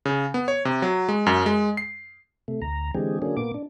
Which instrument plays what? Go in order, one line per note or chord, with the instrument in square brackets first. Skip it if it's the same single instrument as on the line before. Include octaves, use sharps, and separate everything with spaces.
[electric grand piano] C#3
B3
C#5
C3
F#3
G#3
F#2
G#3
C7
[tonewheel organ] C3 A3
D2 A#5
D3 E3 G#3 C4 G4 G#4
D3 F#3 A#3 C#4 D4 G#4
A#2 A#3 B3 D6
D4